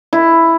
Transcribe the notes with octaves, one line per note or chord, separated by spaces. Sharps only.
E4